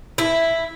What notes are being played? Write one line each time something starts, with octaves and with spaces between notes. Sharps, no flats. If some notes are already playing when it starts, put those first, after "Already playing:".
E4